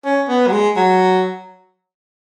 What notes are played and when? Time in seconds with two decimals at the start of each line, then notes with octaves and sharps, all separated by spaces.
0.05 C#4
0.29 B3
0.47 F#3
0.52 G#3
0.76 F#3